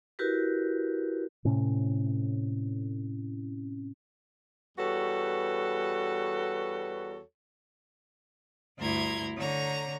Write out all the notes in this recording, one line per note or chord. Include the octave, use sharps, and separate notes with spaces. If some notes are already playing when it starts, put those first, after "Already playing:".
E4 F#4 G4 A#4 B4
A2 C3 C#4
E2 G3 F#4 A4 B4 C#5
D2 G2 E4 A#5 C6 G#6
D3 C#5 A#5